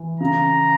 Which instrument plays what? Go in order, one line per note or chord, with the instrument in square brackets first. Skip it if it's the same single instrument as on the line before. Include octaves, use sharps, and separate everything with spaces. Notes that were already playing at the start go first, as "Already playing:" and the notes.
Already playing: [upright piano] E3
[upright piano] C#3 [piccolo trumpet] A#5